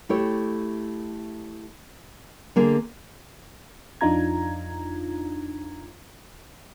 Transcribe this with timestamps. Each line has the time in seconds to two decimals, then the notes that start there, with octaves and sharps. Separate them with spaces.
0.09 A3 E4 G4 A4 C#5
2.56 D3 A#3 G#4
4.01 F2 D4 D#4 F4 A#5 G#6